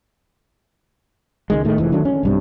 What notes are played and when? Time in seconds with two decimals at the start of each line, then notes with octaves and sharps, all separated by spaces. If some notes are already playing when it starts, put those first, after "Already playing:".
1.50 C#2 D#3 G#3
1.65 A2 D#3 A3
1.78 F1 E3 F3
1.92 D#3 F#3 A3 D4
2.05 C#4
2.23 B1 G2 C3